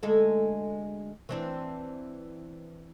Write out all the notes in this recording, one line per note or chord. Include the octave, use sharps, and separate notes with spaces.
D2 G#3 A4
E3 C4 D4